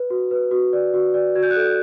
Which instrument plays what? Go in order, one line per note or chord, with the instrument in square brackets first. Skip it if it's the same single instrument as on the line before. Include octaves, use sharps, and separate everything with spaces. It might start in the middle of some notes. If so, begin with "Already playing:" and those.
Already playing: [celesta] B4
F#4
B4
F#4
D5
F#4
D5
F#4 G#6
G6
F#6
A4 G6